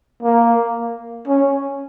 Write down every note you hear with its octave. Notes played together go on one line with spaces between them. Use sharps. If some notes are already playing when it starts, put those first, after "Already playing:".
A#3
C#4